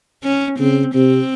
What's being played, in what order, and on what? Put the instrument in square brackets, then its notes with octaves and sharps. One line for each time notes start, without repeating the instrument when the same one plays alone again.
[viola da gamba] C#4
[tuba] C#3 [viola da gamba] C4
[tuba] C3 [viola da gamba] C4